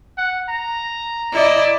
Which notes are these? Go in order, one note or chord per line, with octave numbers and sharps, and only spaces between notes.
F#5
A#5
E4 D5 D#5